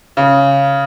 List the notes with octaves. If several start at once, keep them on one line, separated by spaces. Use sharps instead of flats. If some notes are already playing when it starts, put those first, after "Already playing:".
C#3